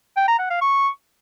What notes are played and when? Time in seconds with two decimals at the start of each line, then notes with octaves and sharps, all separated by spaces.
0.17 G5
0.28 A#5
0.39 F#5
0.50 F5
0.61 C#6